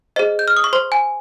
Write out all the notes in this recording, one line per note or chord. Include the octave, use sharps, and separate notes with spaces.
G#4 C5 D#5
G6
F6
D#6
C#6
C5 C6
G#5